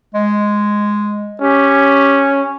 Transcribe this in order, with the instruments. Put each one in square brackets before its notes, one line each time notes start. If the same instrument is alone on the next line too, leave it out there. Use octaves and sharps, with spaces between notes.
[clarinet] G#3
[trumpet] C#4 [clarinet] G4